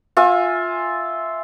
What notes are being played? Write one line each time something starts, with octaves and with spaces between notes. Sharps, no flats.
F4 E5 G#5